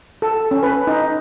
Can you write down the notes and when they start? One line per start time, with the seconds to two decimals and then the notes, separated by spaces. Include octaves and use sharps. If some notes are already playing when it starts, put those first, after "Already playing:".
0.22 A4
0.51 C#4
0.63 B4
0.87 D#4